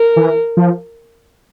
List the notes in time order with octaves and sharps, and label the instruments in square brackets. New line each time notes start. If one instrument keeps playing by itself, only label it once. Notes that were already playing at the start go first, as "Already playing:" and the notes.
Already playing: [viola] A#4
[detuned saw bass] E3
F3